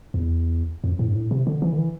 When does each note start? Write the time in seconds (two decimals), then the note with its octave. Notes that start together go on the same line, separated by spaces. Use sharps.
0.14 E2
0.84 F2
0.99 A2
1.07 G2
1.15 A2
1.31 C3
1.47 D3
1.62 E3
1.73 D3
1.78 E3